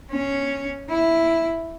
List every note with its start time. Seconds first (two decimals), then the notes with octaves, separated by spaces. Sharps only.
0.11 C#4
0.90 E4